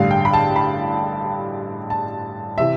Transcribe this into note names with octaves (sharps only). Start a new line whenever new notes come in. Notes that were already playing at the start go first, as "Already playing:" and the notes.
Already playing: A1 G2 D3 G3 F5
G5
B5
A5
B5
A5
C3 E3 E5